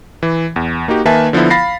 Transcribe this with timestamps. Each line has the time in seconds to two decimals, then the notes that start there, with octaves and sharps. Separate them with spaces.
0.23 E3
0.56 E2
0.88 A#3 D#4 F#4 G4
1.05 D#3 A#3 B4 E5 G#5 A5
1.33 D3 F3 B3 E4
1.50 F5 B5 A6 A#6 C7